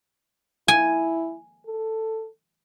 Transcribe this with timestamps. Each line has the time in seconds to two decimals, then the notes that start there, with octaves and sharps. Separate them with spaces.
0.68 E4 G#5
1.67 A4